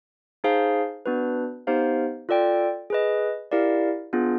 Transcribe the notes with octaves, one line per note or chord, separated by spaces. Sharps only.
D#4 G#4 C5 F5 A5
B3 D4 F#4 B4
B3 D#4 G4 C5 F5
F4 A4 D5 G5
G#4 B4 D#5
E4 G4 A#4 D5 F5
B3 D4 F4 G#4